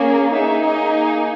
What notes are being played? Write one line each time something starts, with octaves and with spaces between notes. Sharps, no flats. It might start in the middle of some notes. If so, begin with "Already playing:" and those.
Already playing: A#3 C#4 G#4
A#3 D#4 G#4 E5
D#5